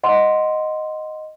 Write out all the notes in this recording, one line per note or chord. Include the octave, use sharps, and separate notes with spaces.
D#5 F#5 C6